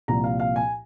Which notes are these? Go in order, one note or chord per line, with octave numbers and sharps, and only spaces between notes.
C2 A#2 F3 A#5
F5
F5
G#5